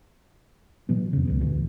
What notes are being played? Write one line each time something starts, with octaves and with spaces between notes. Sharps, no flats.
A#2 E3 F#3 B3
F2 C#3
C#2 D3 B3
D2 A2 E3